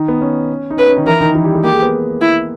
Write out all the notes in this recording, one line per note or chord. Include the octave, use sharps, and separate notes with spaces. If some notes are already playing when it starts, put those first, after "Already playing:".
Already playing: D#3 D#4
B3
C#4
D#4
C#4 B4
C#4
D#3 D#4
E3 E4 A#4
D#3 D#4
E3 E4
G3 G4
G#3 G#4
A#3 G4 A#4
G#3 G#4
B3 B4
E4